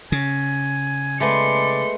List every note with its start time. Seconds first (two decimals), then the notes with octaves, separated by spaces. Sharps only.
0.12 C#3 G#5
1.20 G#3 A3 B3 D5 C6 C#7